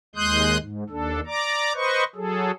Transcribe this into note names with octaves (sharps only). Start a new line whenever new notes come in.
D#2 G#3 C6 D#6 F#6 G6
G#2
D#2 D4 A4
D5 A#5 D6
B4 C5 D#5 C#6
F#3 G#4 A4